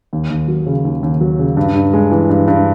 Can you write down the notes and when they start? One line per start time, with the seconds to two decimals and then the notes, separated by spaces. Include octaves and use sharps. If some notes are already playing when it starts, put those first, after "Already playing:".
0.13 D#2
0.30 D#2
0.48 F#3
0.67 C#3
0.85 D#2
1.03 D#2
1.21 F#3
1.39 C#3
1.57 G2
1.75 G2
1.93 G#3
2.11 E3
2.29 G2
2.48 G2